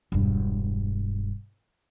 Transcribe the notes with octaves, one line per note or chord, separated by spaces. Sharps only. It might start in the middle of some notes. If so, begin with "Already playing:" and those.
E1 G2